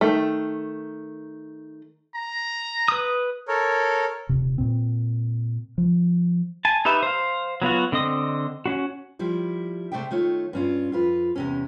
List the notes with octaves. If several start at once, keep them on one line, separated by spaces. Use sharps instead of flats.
D#3 A3
A#5
B4 D#6
A4 A#4 C#5
D#1 C3
A#2 C4
F3
G#5 A5
D#4 G4 B4 E5
C5 F5
F#3 B3 F4 F#4
D3 C4 D#5 D#6
C#4 D4 F#4
F3 G3 E4
C3 A3 C5 D5 E5 G5
D#3 A3 F4 C#5
G2 C#4 F4
F2 F4 B4
E2 C3 C#4